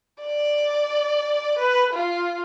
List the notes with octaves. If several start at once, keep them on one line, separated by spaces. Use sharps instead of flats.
D5
B4
F4